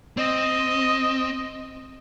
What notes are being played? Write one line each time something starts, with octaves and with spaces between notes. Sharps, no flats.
C4 D#5